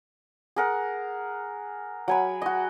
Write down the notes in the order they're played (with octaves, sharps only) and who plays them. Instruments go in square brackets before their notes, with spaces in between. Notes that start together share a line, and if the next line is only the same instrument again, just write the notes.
[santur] G#4 A#4 F#5
F#3 G#5 B5
F#4 D#5